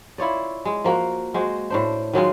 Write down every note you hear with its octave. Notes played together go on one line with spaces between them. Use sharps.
E4 F4 C#5 D5
G#3
F3 A#3 F#4
G#3 F#4 C5
A2 D4 C5
D#3 F#3 G#3 F4